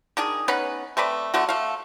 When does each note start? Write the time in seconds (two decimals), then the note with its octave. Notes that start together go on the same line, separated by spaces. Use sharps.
0.17 D#3 D4 G#4
0.48 B3 C#4 D#4 B4
0.97 A3 C4 B4 D5
1.34 D3 A3 F#4
1.49 A3 F5